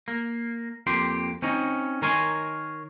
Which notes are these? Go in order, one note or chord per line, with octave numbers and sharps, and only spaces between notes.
A#3
F2 A#3 G4 C6
C4 C#4 D#4
D#3 A#4 C#5 G#5 C6